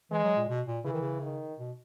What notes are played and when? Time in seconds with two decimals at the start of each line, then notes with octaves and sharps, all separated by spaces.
0.11 E3 G#3
0.24 F#3
0.37 A#2
0.48 B2
0.67 A#2
0.85 C#3 E3
0.93 D#3
1.01 C#3
1.21 D#3
1.59 B2